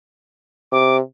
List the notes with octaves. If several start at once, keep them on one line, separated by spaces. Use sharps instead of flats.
C3 D6